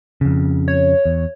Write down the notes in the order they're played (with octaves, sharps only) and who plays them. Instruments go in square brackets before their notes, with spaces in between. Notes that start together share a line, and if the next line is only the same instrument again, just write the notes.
[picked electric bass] F2 C#3
[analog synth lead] C#5
[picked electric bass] E2